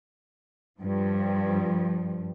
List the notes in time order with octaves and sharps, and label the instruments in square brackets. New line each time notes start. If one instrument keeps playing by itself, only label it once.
[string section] G2 F3